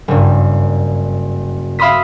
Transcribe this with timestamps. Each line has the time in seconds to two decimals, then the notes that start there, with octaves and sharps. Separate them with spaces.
0.08 F#1 G2
1.79 E5 F5 B5 C6 D#6 B6